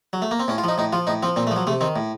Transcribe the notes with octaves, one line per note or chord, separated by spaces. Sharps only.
F#3
A3
A#3
C4
A2 C#4
F4
F3 D#4
A2 D#4
F3 F4
A2 D#4
F3 C4
A#2 C4
A3
F3
F#3
C3 A3
D#3 C4
A2